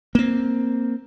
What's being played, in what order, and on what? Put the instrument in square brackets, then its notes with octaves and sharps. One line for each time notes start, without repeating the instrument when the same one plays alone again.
[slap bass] A#3 C4